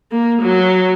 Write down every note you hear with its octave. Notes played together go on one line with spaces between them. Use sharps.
A#3
F#3